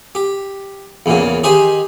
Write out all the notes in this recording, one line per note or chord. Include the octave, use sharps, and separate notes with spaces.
G4
E2 A#2 C#3
D#3 G4 G#4 C5